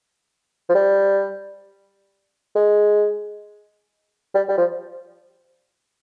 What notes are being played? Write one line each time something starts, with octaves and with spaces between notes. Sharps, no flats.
F3
G3
G#3
G3
G3
F3